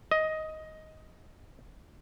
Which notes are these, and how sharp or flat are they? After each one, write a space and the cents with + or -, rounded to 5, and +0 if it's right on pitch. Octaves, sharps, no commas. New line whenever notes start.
D#5 +10